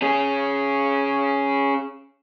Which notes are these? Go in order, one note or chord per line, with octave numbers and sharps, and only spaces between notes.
C#4 G#4